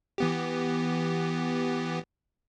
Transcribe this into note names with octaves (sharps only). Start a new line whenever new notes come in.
E3 B3 G4